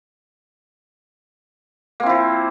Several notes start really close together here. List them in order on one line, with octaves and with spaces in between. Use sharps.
A#3 C4 E4 F3